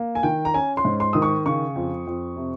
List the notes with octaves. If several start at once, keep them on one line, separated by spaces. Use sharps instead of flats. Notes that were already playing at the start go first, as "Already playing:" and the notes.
Already playing: A#3
G#5
D#3 G5
A#5
C#4 G#5
C6
G#2
C6
D#3 D#6
C#6
C#3 C#6
F2
F2
C3